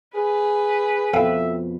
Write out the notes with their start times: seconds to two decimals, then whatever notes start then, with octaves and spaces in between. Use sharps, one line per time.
0.15 G#4 B4
1.13 F2 B2 F3 A4 E5 F5 G5